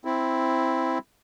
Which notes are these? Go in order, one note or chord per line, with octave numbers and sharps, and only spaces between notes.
C4 E4